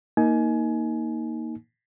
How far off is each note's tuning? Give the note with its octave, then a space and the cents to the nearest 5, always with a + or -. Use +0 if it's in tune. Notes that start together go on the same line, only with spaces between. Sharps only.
A#3 +0 D#4 +15 G#5 +25